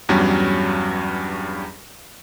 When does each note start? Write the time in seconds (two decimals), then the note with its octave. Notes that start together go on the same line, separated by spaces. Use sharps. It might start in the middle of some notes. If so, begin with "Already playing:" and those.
0.09 E2 G2 F#3 G3 C#4